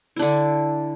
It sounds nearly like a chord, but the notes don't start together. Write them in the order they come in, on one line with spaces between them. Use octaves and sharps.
E4 D4 D3